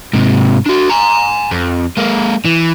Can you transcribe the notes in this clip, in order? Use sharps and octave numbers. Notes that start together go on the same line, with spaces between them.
G#2 C3
D4 F#4
G#5 A#5
F2
G#3 A#3
E3